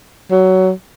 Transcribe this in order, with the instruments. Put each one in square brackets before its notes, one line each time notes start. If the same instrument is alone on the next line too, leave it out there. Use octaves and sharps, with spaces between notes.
[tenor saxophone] F#3